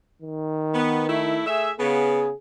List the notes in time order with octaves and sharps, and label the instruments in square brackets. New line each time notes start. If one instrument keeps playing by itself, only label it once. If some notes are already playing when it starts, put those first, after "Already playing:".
[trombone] D#3
[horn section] B3
A3 E4
A3 G#4 E5
[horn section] C#3 B3 [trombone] G#4